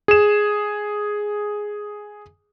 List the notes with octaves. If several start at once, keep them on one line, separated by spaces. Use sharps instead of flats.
G#4 E7